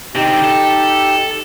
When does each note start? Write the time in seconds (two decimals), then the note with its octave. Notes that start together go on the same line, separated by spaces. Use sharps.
0.16 D3 C4 D#4 G4
0.44 A4